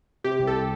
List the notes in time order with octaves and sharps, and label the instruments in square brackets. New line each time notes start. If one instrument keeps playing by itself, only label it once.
[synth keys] C3 G4
C2
A4